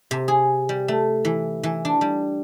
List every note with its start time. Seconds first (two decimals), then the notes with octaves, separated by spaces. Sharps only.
0.11 C3
0.28 G#4
0.69 G3
0.88 A3
1.25 E3
1.63 E3
1.85 D4
2.01 G3